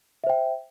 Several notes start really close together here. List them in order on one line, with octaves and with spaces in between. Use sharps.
E5 C5 G5